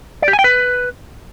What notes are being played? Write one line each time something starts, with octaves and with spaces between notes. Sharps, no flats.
D5
G4
G#5
G5
B4